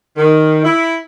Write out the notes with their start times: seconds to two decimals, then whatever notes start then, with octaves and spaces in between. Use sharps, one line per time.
0.17 D#3
0.65 E4